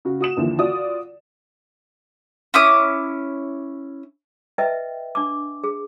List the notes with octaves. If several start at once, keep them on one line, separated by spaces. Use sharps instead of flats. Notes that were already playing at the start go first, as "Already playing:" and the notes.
C#3 F#4
F#4 D#6 E7
D#2 D3 E3 F3
F4 F#4 D5 D#6
C#4 E4 D6 D#6
B4 D#5 E5 G5
D4 D6
G#4